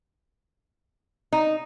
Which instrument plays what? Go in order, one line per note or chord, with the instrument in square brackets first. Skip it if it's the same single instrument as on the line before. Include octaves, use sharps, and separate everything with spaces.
[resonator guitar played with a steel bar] D#4